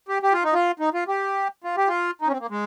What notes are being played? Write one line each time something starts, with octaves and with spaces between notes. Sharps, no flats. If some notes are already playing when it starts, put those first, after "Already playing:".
G4
G4
F4
D#4
F4
D#4
F4
G4
F4
G4
F4
D#4
C#4
C4
A#3
G#3